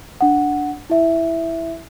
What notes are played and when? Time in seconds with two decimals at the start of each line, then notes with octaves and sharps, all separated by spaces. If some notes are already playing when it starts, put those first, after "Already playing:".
0.21 D4 F#5
0.90 E4 E5